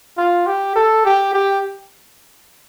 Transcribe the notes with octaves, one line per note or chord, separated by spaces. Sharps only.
F4
G4
A4
G4
G4